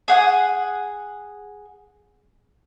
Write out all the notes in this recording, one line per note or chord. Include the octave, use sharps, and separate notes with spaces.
G#4 F#5 D#6